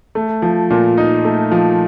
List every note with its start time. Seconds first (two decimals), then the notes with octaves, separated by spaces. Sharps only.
0.15 A3
0.42 F3
0.70 A#2
0.98 D#4
1.25 A3
1.52 F3